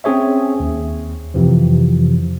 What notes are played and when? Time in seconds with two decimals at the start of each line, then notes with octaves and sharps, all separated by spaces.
0.04 C4 C#4 G#4 C#5 E5
0.60 D#2
1.34 F2 C3 E3 F3